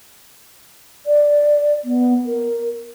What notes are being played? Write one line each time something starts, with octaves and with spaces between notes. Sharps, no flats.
D5
B3
A#4